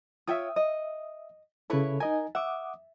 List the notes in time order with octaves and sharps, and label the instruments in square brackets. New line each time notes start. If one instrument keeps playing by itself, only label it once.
[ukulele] F4 C#5 G5 [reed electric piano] E5 D#6
[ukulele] D#5
[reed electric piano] C#3 A4 [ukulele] E4 B4 C#5
[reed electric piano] D#4 D#5 G#5 [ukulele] A#4
[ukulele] E5 [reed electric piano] F#5 D6 D#6